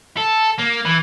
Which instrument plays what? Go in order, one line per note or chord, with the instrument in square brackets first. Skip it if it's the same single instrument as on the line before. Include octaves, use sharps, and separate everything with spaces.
[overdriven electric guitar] A4
A#3
E3